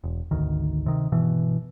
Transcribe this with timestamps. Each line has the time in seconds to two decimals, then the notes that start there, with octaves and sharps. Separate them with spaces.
0.04 E1
0.31 G#1 D2 D#3
0.86 C3 D#3
1.12 G1 B2 E3